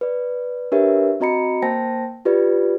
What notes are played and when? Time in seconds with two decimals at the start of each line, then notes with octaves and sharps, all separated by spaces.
0.01 B4 D5
0.72 D4 G4 A#4 B4 C#5 E5
1.20 C4 F#4 D#5 A#5 B5 C#7
1.62 A#3 C5 G5 A5 A#6
2.25 F4 G4 B4 D5